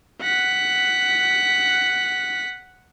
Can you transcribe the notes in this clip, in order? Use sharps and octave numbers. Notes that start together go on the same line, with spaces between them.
F#5 B6